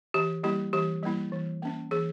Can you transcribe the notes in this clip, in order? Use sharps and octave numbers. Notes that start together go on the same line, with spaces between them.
E3 G4
G3 A#3 E4 G4
E3 G4
G3 A#3 E4
E3
A#3 C#4
E3 G#4